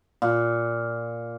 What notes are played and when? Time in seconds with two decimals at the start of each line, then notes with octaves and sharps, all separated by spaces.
0.22 A#2